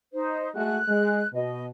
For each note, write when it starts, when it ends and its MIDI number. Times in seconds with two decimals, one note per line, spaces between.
0.12 0.48 63
0.12 0.48 72
0.55 0.79 56
0.55 0.79 57
0.55 0.79 66
0.55 1.26 90
0.89 1.22 56
1.33 1.68 47
1.33 1.65 75